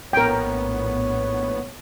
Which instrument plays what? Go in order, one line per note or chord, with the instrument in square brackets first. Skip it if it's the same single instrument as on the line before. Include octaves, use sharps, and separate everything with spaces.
[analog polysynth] A#1 A2 B3 [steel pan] A#4 G5 [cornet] C#5